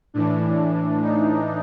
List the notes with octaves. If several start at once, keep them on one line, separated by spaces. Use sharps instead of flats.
A2 E3 D4
D#4